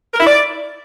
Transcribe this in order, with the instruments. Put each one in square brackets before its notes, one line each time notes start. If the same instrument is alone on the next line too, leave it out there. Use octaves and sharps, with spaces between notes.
[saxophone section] A#4
E4
D5